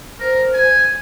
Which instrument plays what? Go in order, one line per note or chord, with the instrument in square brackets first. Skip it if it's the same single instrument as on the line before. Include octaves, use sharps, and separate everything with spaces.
[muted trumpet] A#4 [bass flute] C5
[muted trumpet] G#5